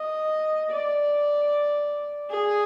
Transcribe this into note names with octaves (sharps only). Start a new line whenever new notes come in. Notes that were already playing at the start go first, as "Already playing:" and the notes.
Already playing: D#5
D5
G#4